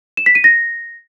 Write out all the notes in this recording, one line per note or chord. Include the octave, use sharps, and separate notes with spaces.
E7
B6
D#7
A#6